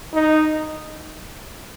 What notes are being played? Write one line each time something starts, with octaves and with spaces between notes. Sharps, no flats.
D#4